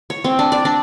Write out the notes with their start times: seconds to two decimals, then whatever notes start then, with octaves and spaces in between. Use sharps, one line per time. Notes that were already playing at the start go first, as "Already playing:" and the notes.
0.10 C#5
0.24 C4
0.39 D4
0.52 D5
0.65 D4